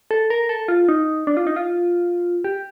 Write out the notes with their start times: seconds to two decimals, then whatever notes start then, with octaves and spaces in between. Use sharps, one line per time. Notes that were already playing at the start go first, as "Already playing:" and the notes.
0.11 A4
0.30 A#4
0.49 A4
0.68 F4
0.89 D#4
1.27 D4
1.37 F4
1.47 D#4
1.56 F4
2.44 G4